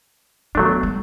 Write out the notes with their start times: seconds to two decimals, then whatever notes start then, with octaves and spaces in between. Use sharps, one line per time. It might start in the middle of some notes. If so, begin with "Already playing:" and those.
0.55 F#3 A3 B3 D4
0.83 G3